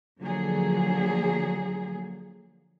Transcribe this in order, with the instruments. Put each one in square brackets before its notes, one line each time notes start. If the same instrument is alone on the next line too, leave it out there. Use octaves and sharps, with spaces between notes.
[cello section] D3 F3 F#3 A#3 G#4